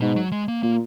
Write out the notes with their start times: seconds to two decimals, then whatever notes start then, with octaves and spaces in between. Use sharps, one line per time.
0.01 G#2 B2
0.16 F#3
0.32 G#3
0.48 A#3
0.63 A#2 A#3